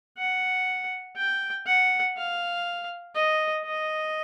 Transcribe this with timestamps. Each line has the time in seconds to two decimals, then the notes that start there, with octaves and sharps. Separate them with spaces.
0.18 F#5
1.17 G5
1.67 F#5
2.17 F5
3.16 D#5
3.65 D#5